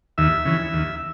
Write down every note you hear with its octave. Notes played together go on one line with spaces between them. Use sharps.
D#2 E5
C#3 E3
D#2